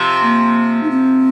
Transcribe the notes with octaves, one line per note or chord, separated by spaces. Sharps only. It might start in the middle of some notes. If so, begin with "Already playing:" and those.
Already playing: C3 F3
A#3
D#4
C4